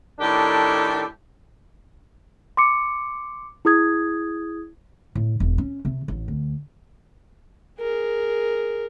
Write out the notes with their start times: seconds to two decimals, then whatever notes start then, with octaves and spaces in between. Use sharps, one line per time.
0.20 A2 D#3 D4 G4 A4
2.57 C6 D6 C#7
3.65 E4 G#4 D#6 G#6
5.15 A2
5.40 E1
5.58 C#4
5.85 C3
6.08 A1
6.28 D2
7.80 G#4 A#4